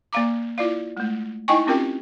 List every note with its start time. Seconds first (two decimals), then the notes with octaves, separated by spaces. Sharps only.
0.13 A#3 D5 F5 A#5 D6
0.58 E4 F4 D5 F5
0.97 G#3 A3
1.48 D#4 E4 D#5 G5 G#5 C#6
1.67 C4 C#4 F4 G4 A#4 G5